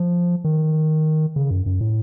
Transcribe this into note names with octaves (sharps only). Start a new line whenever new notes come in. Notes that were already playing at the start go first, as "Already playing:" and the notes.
Already playing: F3
D#3
C#3
F#2
F#2
A2